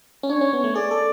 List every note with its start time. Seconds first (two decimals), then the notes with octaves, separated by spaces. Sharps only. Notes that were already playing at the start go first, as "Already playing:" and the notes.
0.23 C#4
0.29 D4 C#5
0.41 C#4
0.53 B3
0.64 A3
0.75 G#4 D5
0.91 A4